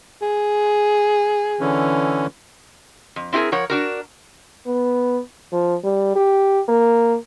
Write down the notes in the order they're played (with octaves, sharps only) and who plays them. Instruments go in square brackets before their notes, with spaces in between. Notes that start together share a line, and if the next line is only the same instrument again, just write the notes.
[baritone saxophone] G#4
[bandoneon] D3 E3 C#4
[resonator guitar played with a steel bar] F2
C4 E4 G4 G#4 A#4
F3 A#4 C#5 F#5
D4 F#4 A#4
[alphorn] B3
F3
G3
G4
A#3